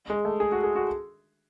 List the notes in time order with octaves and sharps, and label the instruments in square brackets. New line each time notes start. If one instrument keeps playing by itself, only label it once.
[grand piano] G#3
A3
G#4
F#4
G#4
F#4